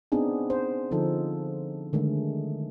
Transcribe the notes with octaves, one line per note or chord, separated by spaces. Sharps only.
B3 C4 D4 D#4 G#4
C5
D3 F3 D#4 A4
D3 D#3 G#3 A3